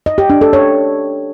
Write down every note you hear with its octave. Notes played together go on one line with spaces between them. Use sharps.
D#5
G4
D4
A4
C#5